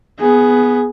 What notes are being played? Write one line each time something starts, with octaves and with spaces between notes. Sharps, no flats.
B3 G#4